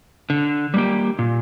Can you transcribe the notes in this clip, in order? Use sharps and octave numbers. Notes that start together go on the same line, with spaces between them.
D3
G3 A#3 G4
A#2